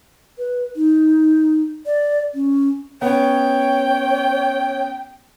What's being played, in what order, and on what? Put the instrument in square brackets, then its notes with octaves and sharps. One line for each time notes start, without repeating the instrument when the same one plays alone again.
[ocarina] B4
D#4
D5
C#4
[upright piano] B3 C#4 [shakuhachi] C#5 [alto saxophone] G5